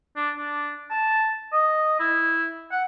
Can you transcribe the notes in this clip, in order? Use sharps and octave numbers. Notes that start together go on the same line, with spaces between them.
D4
D4
A5
D#5
E4
F#5